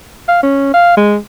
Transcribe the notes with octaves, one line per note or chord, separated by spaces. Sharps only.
F5
C#4
F5
G#3